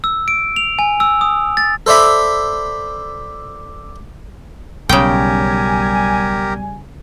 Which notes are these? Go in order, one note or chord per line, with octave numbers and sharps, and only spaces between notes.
E6
D7
F7
G#5
E6
D#6
A6
A4 C5 D5 E5 B5
B1 C#3 G3 G4 A#4 G5 G#5